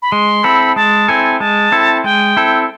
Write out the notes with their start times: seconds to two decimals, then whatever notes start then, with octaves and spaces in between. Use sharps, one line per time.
0.02 B5
0.12 G#3 C6
0.44 C4 E4 A4 B5
0.76 G#3 A5
1.08 C4 E4 A4 G#5
1.40 G#3 A5
1.72 C4 E4 A4
2.04 G#3 G5
2.37 C4 E4 A4